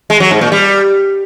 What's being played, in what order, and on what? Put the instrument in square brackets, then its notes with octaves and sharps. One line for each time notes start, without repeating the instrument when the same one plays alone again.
[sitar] G#3
F#3
G#2
A#2
G3